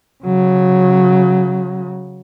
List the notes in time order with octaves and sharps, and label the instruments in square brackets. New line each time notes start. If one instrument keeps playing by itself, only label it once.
[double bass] C#3 F#3